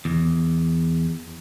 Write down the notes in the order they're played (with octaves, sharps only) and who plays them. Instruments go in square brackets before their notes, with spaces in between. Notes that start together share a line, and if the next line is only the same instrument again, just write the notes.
[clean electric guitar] E2